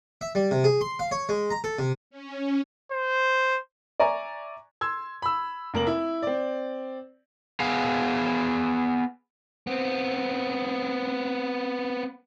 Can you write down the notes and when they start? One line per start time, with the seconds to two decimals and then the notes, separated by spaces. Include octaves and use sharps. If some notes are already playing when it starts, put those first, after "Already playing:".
0.21 E5
0.35 G3
0.51 C3
0.64 G#4
0.81 C6
0.99 F5
1.11 C#5
1.29 G#3
1.50 A#5
1.64 A4
1.79 C3
2.10 C#4
2.92 C5
4.00 D5 E5 G#5 A#5 C#6 D6
4.81 C6 E6 G#6
5.22 B5 E6
5.74 F1 A#3 A#4 F#7
5.87 E4
6.22 C4 D5
7.60 B3 G#4 F5
9.67 B3 C4